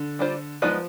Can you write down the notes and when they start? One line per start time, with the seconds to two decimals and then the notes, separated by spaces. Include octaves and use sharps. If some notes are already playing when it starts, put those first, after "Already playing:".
Already playing: D3
0.19 G3 D4 F4 C5
0.62 F3 G#3 B3 D#4 B4 D5